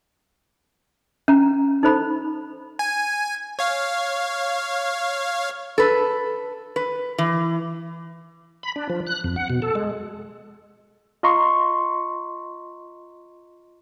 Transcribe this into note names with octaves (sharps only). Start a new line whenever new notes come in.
C#4 A#5
D#4 A4 C5 B5
G#5
C#5 F5
A4 B4
B4
E3
B5
D4
F3
F#6
F2
F#5
B2
A4
G#3
F4 D#5 A#5 C6 C#6